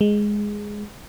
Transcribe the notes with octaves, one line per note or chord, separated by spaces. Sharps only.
G#3